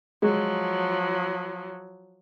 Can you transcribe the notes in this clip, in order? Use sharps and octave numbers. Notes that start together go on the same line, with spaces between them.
F3 F#3 G#3